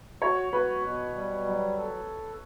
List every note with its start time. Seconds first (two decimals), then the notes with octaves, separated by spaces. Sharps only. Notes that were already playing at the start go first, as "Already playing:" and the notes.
0.22 F#4 C#5
0.53 F#4 B4
0.84 B2
1.15 G3
1.45 F#3
1.77 A4